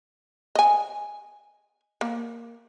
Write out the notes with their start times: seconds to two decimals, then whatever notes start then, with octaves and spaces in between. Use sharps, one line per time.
0.55 D#5 G#5
2.01 A#3